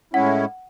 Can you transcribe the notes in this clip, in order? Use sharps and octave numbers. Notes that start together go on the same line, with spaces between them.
A2 G#3 C#4 E4 F#5